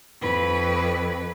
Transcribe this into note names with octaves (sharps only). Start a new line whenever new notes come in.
F2 B4